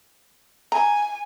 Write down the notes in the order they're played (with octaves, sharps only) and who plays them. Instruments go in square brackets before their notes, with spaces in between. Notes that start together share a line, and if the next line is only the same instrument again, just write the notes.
[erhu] G#5 [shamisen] A#5